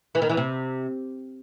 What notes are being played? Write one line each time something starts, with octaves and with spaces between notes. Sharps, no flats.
E3
D#3
E2 E3
C3